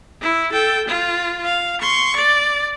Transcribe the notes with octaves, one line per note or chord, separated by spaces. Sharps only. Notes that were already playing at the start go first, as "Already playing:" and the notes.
E4
A4 G5
F4
F5
C6 C#6
D5